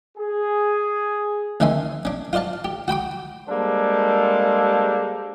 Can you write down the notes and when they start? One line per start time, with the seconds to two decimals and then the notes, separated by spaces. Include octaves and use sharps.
0.18 G#4
1.60 D2 D#3 C#4 E5 G#5 C6
2.05 C#4 D4
2.33 F4 C5 D5 F5 A5
2.65 G4
2.88 F#4 G5 B5 D6
3.48 G3 G#3 A#3 D4 A4 C5